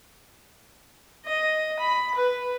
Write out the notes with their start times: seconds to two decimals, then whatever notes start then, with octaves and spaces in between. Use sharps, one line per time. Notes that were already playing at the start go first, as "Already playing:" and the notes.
1.26 D#5
1.80 B5
2.15 B4